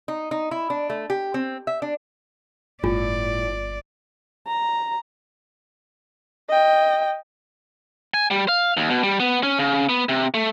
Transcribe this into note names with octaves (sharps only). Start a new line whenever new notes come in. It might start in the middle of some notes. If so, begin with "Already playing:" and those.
D#4
D#4
E4
D4
A3
G4
C4
E5
D4
G1 A2 F4 D5
A#5
D#5 G5
G#5
G3
F5
D#2
B2
G3
B3
C#4
C#3
B3
C3
A3